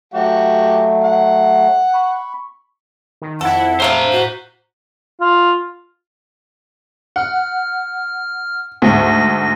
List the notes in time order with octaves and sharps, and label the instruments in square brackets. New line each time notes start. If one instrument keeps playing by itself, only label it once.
[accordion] F#3 A3 [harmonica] F#4 G4
[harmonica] F#5
[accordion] B5 C#6
[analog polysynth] D#3
[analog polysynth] F2 E4 [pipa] A4 [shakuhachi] F#5
[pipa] C3 A3 F5 [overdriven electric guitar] C5 A#5 [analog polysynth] D#7
[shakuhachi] F#4
[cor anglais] F4
[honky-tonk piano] F#5 [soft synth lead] F6
[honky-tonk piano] D2 G#2 [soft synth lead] A#6